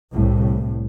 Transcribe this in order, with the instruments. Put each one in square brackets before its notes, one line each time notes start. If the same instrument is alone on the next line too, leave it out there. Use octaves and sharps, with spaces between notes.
[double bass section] C2 A2